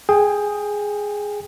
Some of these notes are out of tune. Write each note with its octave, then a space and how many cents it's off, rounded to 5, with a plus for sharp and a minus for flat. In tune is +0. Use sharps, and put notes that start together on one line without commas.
G#4 +0 G5 +20